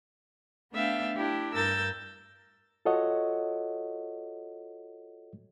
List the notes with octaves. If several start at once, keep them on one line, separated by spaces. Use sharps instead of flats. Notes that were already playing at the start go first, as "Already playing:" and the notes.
A3 B3 D4 E5 F5 G5
D4 E4 G4
G2 A#4 E6 G6 A6
F4 F#4 A4 C#5 D#5 F#5